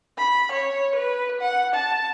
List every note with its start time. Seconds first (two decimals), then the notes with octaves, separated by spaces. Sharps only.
0.18 B5
0.52 C#5
0.96 B4
1.41 F#5
1.74 A5